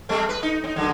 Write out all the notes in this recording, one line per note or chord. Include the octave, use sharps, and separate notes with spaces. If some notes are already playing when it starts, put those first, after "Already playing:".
G3 A3 C4
B4
D#4
C4 D#4
F#2 D3 G#3